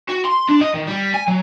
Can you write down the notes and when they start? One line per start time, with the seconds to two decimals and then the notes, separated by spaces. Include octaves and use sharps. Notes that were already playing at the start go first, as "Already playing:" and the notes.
0.09 F#4
0.25 C6
0.49 D4
0.61 D#5
0.74 D#3
0.87 G3
1.14 G#5
1.28 F#3